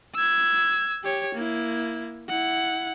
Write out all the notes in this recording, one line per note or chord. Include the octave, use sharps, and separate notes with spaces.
E6 G#6
G4 C#5
A#3 E4
E4 F#5